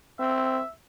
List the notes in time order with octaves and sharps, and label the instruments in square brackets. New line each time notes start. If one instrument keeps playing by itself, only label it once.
[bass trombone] C4 [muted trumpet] E5